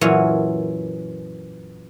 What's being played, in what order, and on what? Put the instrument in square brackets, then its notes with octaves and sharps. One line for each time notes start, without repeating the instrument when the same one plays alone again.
[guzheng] F#2 A#2 E3 F#4 C#5